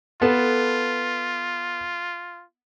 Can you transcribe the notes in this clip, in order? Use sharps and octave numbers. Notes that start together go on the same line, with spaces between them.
B3 F4 A4 B4